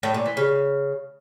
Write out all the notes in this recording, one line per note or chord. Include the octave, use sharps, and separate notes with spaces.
A2
A#2
E3
C#3